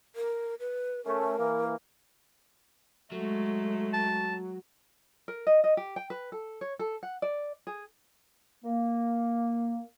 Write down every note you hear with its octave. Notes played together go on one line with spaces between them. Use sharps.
A#4
B4
A3 C#4 A#4
E3 A#3
F#3 G#3 A3
A5
A#4
D#5
D#5
G4
G5
B4
A4
C#5
A4
F#5
D5
G#4
A#3